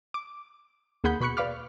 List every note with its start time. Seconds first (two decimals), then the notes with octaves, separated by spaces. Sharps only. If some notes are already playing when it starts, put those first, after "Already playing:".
0.14 D6
1.04 D#2 A#3 G#4 F#5 B5 G6
1.21 B2 B5 C#6 F#6 C#7
1.37 B4 D5 F5 B5 D6 F6